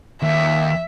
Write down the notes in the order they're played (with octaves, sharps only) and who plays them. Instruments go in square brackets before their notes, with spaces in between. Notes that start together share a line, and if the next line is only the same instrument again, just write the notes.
[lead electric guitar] D#2 [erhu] E5